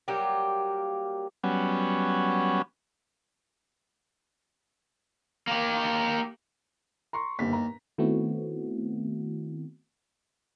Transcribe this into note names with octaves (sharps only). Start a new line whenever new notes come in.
F#3 G3 A#3 G4
F#3 G3 B3 C#4
A#3 G4
A#5 C6 C#6
G1 D#2 B6
A#5
D#3 A3 B3 C4 E4 F#4